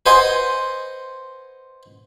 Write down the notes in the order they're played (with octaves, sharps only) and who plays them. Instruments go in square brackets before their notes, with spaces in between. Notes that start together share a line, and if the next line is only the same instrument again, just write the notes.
[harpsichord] B4 C5 D#5 F#5 G#5 C6